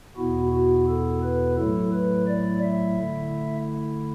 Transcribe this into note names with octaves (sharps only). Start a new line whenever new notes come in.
E2 B2 B3 E4 F#4
F#4
A4
B4
A2 F#3 A3 E4 A4
B4
D5
E5
D3 A3 E4